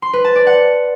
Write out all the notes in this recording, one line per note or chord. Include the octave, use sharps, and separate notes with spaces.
C6
B4
A5
D5
F#5